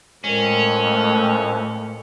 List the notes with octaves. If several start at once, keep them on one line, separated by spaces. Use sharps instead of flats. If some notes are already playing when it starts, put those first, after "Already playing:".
F2 A2 G#3 A3 C#4 A#4